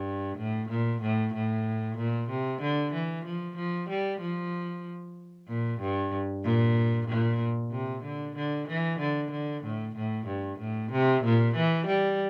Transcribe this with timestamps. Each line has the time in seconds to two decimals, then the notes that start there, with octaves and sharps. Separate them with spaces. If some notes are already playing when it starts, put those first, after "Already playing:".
Already playing: G2
0.38 A2
0.69 A#2
1.02 A2
1.34 A2
1.98 A#2
2.30 C3
2.62 D3
2.93 E3
3.25 F3
3.57 F3
3.89 G3
4.21 F3
5.48 A#2
5.81 G2
6.44 A#2
7.08 A#2
7.72 C3
8.03 D3
8.36 D3
8.68 E3
8.99 D3
9.32 D3
9.64 A2
9.96 A2
10.27 G2
10.59 A2
10.92 C3
11.24 A#2
11.55 E3
11.87 G3